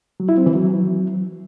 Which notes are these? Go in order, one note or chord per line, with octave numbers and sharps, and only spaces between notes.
F#3
E4
C4
E3
F#3